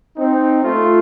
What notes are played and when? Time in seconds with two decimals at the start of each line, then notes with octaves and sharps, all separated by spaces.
0.18 C4 D#4
0.64 A3 F4